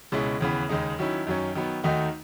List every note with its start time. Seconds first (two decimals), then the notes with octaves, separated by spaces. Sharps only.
0.12 C#2 B2 G#3 C#4 E4
0.41 D#2 C#3 E3 B3
0.69 D#2 C#3 G#3 D#4
0.99 D#3 F#3 C#4 E4
1.27 F#2 D#3 F#3 C#4
1.55 D#3 F#3 B3
1.83 D#2 D#3 A3 D#4 F#4